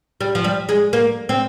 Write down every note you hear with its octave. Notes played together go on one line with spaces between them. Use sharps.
G3
F3
G3
G#3
A#3
C4